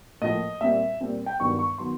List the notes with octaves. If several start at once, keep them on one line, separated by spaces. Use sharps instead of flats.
A2 F3 A#3 D#5
A#2 G3 C4 E5
A#2 G3 C4
G5
G2 D#3 F#3 B3 C#6
C#6
D#3 F#3 B3 C6